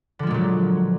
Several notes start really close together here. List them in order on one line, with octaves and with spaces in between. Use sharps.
D3 F3 G#3 A#2 F#3